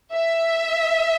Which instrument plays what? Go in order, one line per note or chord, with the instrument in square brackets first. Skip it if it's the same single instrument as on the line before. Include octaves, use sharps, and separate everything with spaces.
[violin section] E5